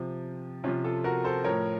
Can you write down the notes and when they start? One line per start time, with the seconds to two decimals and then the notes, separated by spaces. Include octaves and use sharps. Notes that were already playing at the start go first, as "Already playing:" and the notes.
Already playing: C3 F3
0.64 C3 C#4 F4
0.68 F3
0.84 F4 A4
1.04 F#4 A#4
1.25 A4 C5
1.44 A2 F3 A#4 C#5